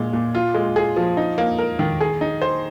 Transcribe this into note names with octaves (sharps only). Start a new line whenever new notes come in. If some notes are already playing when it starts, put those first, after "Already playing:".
Already playing: A#2 G#3
A#2
F4
G#3
G#4
F3
D#4
A#3
A#4
D#3
G#4
D#4
C5